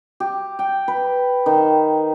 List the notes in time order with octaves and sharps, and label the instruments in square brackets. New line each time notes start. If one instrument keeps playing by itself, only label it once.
[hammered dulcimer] G4
G5
B4
D#3